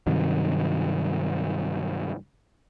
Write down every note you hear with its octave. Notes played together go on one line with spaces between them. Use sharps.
G2 C3 D#3 F#3